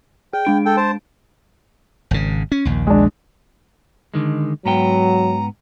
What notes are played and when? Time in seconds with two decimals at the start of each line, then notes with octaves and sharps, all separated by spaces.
0.33 G#4 G5
0.45 G#3 D4 D7
0.66 A4 G5
0.77 C5 A5
2.11 G#1 C#3
2.52 C#4
2.65 A#1 D#2
2.87 G#3 D4
4.14 D3 D#3 G#3
4.66 G#2 F#3 B3 G5 A#5